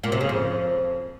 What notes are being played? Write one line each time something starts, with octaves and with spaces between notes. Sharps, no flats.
A#2
C3
C#3
F2